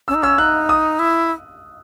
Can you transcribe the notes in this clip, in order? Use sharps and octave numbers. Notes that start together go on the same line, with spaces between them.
C#4 E6
D#4
C#4 E6
D#4 F#6
D#6
E4